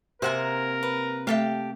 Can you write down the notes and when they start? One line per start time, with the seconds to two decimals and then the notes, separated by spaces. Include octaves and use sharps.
0.22 C3 A#3 A#4 C5 F#5 G#5
0.83 B4
1.27 A3 G4 A4 E5 F5 G5